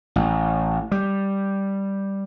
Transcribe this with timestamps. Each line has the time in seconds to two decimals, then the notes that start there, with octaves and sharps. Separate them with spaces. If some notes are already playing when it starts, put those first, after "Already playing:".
0.16 A1
0.91 G3